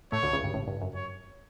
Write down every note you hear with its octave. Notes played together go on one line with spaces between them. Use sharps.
A2 A3 C#5
D2 D3
C#2 C#3
G2
A1 A2
G2
F#2
C#5